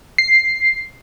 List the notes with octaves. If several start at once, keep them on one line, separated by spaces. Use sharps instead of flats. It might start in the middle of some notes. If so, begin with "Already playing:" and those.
C7